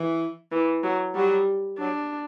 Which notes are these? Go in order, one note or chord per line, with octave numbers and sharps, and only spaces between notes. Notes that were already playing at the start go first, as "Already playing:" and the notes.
Already playing: E3
E3
F#3
F#3 G3
F#3 D4